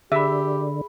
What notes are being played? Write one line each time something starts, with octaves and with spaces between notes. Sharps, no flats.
D3 G4 G#4 E5 B5